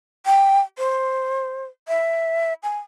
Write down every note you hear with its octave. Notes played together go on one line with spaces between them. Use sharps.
G5
C5
E5
G#5